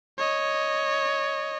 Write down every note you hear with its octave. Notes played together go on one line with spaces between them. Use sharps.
C#5 D#5